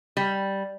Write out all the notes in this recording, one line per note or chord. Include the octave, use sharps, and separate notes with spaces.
G3